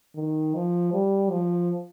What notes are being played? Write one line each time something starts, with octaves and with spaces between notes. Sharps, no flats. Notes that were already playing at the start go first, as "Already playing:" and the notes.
D#3
F3
G3
F3